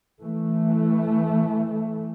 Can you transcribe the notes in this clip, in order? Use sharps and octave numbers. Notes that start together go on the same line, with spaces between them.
E3 A3